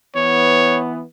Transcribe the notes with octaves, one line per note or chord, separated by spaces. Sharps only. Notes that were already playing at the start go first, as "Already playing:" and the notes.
E3 B3 C#5